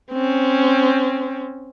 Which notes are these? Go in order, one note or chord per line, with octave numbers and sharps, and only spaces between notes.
C4 C#4